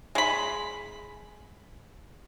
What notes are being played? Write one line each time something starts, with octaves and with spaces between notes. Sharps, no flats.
G#3 B5